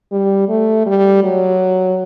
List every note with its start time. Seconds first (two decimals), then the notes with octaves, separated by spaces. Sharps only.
0.12 G3
0.49 A3
0.86 G3
1.23 F#3